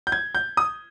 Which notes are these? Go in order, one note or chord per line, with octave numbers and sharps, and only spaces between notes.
G6
G#6
G6
D#6